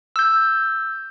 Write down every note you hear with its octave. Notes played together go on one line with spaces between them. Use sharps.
E6 G6